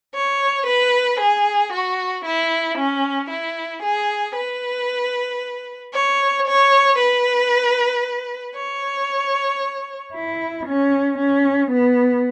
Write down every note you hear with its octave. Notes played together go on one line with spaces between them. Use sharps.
C#5
B4
G#4
F#4
E4
C#4
E4
G#4
B4
C#5
C#5
B4
C#5
E4
C#4
C#4
B3